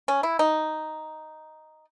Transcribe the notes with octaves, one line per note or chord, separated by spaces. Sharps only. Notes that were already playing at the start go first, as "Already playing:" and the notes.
C#4
E4
D#4